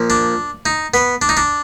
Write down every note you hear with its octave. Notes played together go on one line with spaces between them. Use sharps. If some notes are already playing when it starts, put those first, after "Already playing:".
Already playing: A#2 F3
D4
D#4
B3
D4
D#4
D4